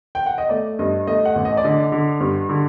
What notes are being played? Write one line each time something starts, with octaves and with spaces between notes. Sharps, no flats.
G5
F#5
D#5
A3 D5
G2 D#5
A3 D#5
F#5
A1
D#5
D5
D3 D#5
D3
G2
D3